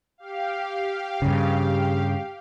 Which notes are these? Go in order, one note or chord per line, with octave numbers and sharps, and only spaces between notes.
G4 F5
G2 C#3